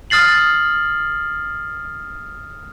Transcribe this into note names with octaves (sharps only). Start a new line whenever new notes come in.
D#6 F6 A6 C7 F#7